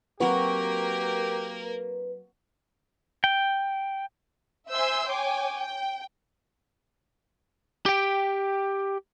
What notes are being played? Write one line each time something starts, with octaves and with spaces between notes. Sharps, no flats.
F#3 A#3 C4 F#4 G4 A#4 B4
G5
C5 E5 G#5 C6 E6 G6
C#5 G5 G#5 D6
G5
G4 G5